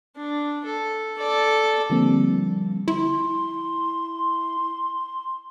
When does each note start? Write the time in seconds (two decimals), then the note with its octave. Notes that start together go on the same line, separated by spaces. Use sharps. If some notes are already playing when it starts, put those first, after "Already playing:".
0.16 D4
0.65 A4
1.18 A4 D5
1.90 D3 F3 G3 A#3 C4
2.88 E4 C6